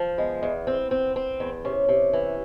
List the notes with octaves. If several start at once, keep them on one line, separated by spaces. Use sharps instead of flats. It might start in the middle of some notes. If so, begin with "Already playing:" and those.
Already playing: F3
G#3 B3
E2
C4
C4
C4
E2
C3 C#4
C3
E3